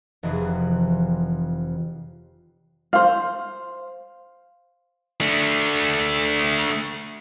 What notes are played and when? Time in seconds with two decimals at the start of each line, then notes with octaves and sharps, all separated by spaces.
0.23 F1 F2 E3 E4 G#4
2.93 C5 F5
5.21 A3 D4